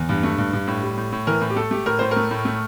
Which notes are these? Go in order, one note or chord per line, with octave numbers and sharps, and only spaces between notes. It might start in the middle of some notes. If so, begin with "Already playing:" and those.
Already playing: E2
G2
A3
G2
G2
A2
G3
A2
A2
E3 A#4
A2
G4
A3 A4
A3 G4
A2 A#4
A2 C5
A#4
A3
A2
A3